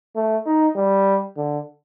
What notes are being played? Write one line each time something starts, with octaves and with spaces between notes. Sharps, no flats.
A3
D#4
G3
D3